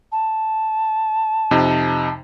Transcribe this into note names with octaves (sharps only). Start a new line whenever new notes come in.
A5
F2 C3 D#4